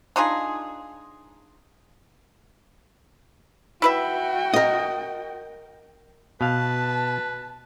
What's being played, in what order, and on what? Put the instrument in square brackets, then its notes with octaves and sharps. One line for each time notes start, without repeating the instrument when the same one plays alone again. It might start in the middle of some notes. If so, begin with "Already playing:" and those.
[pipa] D4 D#4 F4 G#4
[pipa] E4 B4 E5 [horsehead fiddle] F#4 G5
[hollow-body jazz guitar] A#4 D#5
[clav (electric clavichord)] B2 F5 [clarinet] B4 [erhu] A5